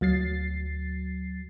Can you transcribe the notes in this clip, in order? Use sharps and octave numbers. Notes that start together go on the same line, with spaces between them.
D2 F#3 A6 C7